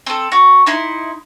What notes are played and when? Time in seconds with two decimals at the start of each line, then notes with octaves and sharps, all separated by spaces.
0.06 C4 A4
0.32 F#4
0.66 D#4 E4 C6